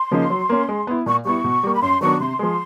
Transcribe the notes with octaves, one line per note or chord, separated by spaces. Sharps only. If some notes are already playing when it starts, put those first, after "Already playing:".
Already playing: C6
C#3 F3 A#3 D#4
F#3
A#3 C#4
G#3
B3 E4
A#2 C#6
G3 B3 E4 C#6
B2
G3 A#3
B5
F#2 C6
D#3 F#3 B3 D4 C#6
C3 C6
F3 G#3